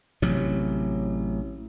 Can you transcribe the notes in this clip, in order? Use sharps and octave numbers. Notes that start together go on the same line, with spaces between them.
A1 C3 F#3